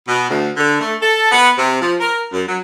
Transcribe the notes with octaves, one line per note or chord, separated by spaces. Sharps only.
B2
D2
D3
A3
A4
B3
C3
F3
A#4
F#2
F#3